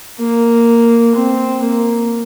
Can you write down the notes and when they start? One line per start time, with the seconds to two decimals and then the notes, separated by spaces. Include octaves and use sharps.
0.19 A#3
1.16 C4
1.64 A#3